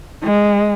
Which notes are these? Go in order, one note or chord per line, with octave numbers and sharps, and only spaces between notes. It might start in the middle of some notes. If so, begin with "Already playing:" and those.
G#3